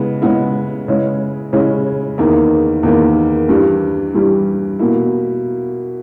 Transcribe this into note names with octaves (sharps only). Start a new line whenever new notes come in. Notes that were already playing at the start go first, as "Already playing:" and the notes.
Already playing: C#3 G#3 B3 E4
C#3 G#3 B3 E4
C#3 G#3 C#4 E4
C#3 G#3 C#4 E4
E2 D#3 A#3 E4
E2 D#3 A#3 E4
G2 E3 G3
G2 E3 G3
B2 A#3 E4